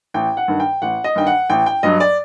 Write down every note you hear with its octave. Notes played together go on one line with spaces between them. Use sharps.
A1 G5
F#5
G2 D#3
G5
A1 F#5
D#5
G2 D#3 G5
F#5
A1 G5
G5
G2 F#3 D#5
D5